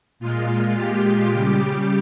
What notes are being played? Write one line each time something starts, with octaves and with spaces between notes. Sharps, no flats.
A#2 G#3 F4
G4
C#3 G3